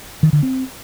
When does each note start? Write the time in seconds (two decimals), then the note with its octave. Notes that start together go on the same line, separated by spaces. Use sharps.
0.23 D#3
0.33 D3
0.43 C4